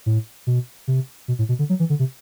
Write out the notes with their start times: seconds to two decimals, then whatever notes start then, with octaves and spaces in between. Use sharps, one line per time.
0.06 A2
0.47 B2
0.88 C3
1.28 B2
1.39 A2
1.49 B2
1.59 D3
1.69 F#3
1.80 E3
1.90 D3
1.99 C3